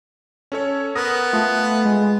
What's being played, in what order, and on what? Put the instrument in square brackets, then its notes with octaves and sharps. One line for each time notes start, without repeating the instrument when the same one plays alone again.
[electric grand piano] C#4 A4 C#5
[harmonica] B3 [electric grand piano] A#4 D#6 A#6
[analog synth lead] A3 [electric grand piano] F4
[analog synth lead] G#3